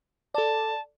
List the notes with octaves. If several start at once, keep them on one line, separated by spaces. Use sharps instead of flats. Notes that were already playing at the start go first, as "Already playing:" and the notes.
A4 D5 A5